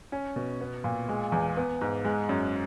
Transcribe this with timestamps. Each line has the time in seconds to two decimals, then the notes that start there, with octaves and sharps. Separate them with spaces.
0.12 C#4
0.36 B2
0.61 B3
0.84 A#2
1.09 G#3
1.32 E2
1.57 B3
1.81 G#2
2.05 G#3
2.29 F#2